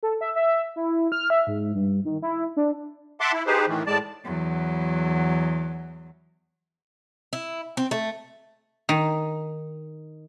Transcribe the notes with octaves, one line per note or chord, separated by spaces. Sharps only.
A4
E5
E5
E4
F6
E5
G#2
G2
D#3
E4
D4
E5 F#5 A5 C6 D6
E4
D#4 G4 G#4 B4 C5
A2 D#3 E3
A2 G#3 D5 A5
E2 F#3
E4
C4
A3
D#3